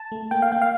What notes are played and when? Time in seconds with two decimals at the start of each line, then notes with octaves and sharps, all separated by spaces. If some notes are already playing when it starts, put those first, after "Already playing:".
Already playing: A5
0.12 A3
0.31 A#3 G5
0.42 F5
0.52 A#3 G5
0.62 F5